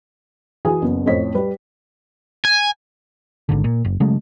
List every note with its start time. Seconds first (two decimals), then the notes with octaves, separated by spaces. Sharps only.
0.65 E3 F#4 G#4 G#5 D#6
0.82 F#1 B3
1.06 F2 A2 C5 C#5 D#5 B6
1.34 G3 B4
2.45 G#5
3.49 G#1 G#2 D3
3.64 A#2
3.85 F#1
4.00 C#3 F#3 G#3 A3